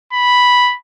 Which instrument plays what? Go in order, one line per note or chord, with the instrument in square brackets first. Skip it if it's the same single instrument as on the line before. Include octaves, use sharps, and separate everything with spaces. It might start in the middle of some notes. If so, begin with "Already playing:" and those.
[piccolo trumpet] B5